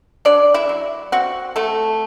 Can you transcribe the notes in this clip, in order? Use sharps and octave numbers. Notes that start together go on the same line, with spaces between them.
F#3 D4 D5
E4 E5
F#3
C4 F#4 F#5
C3 A3 A4